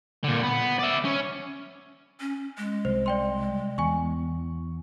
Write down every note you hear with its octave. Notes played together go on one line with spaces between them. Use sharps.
A#2 D3
B3
D5 E5
C#4
C#4
G#3
C2 C5
D5 G5 C6
E2 G#5 C#6